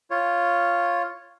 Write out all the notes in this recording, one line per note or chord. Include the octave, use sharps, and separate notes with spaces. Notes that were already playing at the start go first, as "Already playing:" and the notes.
F4 C#5